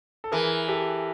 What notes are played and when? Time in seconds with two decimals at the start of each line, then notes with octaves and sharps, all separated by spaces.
0.24 A4
0.32 E3 G#4 A#4
0.68 G4 A4